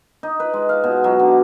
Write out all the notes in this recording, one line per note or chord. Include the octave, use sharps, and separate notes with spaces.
D#4
B4
G#3
F5
B2
F#3
D3